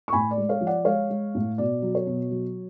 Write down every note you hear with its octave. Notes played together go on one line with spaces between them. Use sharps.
C#6
A2 G#5 B5
D5
G#3
C#5 F5
F3
D5 F#5
G#3 C#5 F5
G#3
A2
B2 D5
F#3
C#5
B2
F#3